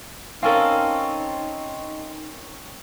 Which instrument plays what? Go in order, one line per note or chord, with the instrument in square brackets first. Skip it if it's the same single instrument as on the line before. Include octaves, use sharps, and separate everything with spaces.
[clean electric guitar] C4 C#4 A4 [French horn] D#4 [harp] A#4 F5